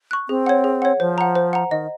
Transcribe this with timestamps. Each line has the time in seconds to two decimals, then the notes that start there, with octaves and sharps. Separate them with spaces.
0.11 C#6 F#6
0.29 C4 G#4
0.46 C#5 F#5
0.64 G#4
0.82 C#5 F#5
1.00 F3 C5
1.18 F#5 A#5
1.35 C5
1.53 F#5 A#5
1.71 D#3 D#5